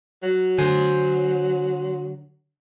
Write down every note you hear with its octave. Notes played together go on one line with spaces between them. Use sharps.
F#3
D3 C5 G#5